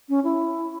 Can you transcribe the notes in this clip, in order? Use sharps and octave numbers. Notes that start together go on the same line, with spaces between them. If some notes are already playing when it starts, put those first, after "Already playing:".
C#4
E4